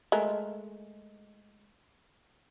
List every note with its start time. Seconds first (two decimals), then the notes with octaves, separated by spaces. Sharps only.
0.12 G#3 A3 A#4